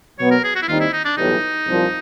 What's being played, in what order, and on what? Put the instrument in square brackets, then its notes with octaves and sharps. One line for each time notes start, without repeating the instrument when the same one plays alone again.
[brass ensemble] B2 F#3 B3 [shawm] C#5
[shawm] A#4
G#4
F#4
E4
[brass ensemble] D#2 D#3 G3 C4 D#4 [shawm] F4
[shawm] E4
D#4
D4
[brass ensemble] B1 A2 E3 G3 [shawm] D#4
[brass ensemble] C2 A#2 F3